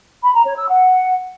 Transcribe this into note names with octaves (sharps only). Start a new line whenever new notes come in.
B5
A#5
C#5
E6
F#5